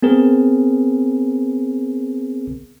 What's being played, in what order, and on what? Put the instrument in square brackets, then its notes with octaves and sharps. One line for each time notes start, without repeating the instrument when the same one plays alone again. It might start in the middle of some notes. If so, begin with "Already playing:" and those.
[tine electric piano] B3 C4 G#4 A#4